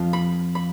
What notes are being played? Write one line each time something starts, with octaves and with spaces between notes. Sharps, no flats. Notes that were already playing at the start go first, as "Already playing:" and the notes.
Already playing: F2 F3 F4
B5
B5